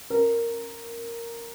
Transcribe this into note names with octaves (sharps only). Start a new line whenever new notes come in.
A#4